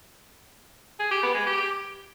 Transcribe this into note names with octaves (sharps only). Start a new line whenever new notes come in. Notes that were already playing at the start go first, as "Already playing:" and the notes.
G#4
G4
B3
G#3
G4